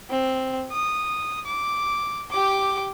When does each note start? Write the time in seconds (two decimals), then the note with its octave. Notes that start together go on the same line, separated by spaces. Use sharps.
0.10 C4
0.72 D#6
1.45 D6
2.31 G4 D6